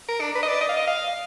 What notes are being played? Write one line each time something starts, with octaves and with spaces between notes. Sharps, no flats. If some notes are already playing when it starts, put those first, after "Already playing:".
A#4
D4
B4
D#5
D5
D#5
F5
D#5
F5